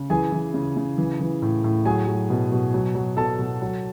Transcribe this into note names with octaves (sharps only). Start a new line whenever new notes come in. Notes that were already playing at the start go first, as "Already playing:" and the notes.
Already playing: C#3
E3 G#4 G#5
E3
C#3
C#3
E3
E3
A2
A2
F#3 G#4 G#5
F#3
B2
B2
F#3
F#3
B2 A4 A5
B2
F#3